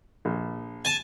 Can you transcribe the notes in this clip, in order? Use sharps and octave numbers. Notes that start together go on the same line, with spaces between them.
A#1
G#5 A5